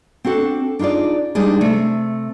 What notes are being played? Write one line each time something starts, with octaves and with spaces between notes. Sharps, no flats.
C4 D4 F#4 A4
D4 D#4 F4 G#4 D5
G3 G#3 D4 D#4 G#4 D5
C3 A3